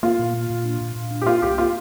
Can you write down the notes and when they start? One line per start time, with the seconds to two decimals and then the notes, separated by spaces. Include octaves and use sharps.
0.03 A#3 F4
0.19 A#2
0.34 A#3
0.50 A#2
0.64 D4
0.81 A#2
0.96 A#2
1.11 D4
1.22 G4
1.26 A#3 F4
1.42 C2 G4
1.58 A#3 F4